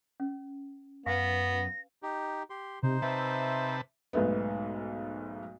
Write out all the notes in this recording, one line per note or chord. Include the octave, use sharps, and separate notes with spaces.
C#4
F#2 B3 B4 F5 G#5 A#6
D#4 G4
G4 C6
C3 D#4 C5
C3 B4 E5 A5
B1 G#2 A3 B3